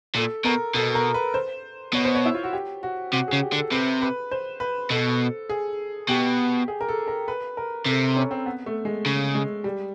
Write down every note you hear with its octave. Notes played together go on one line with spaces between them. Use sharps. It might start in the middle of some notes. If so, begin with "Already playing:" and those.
A#2 A4
B2 A#4
B2 A4
A#4
B4
C5
B2 C#5
C5
C#5
E4
F4
F#4
G4
F#4
C3 F#4
G#4
C#3
G4
D3
A4
C3 B4
B4
C5
B4
B2 A4
G#4
B2 G4
G#4
A#4
A4
A#4
B4
A#4
C3 A4
C#4
C4
B3
A3
G#3
C#3
G#3
G3